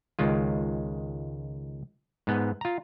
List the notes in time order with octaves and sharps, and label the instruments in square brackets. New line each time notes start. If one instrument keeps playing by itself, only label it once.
[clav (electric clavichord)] C#2 D#3 G#3 F4
G#2 B3
F4 A#5